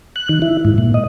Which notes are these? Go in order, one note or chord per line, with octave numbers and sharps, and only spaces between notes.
F#6
D#3
E4
G#2
A#2
D#5